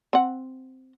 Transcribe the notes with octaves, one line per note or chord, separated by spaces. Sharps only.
C4 F#5